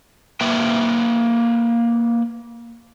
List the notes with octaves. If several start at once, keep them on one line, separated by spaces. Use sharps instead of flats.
A#3 B4 E5 G5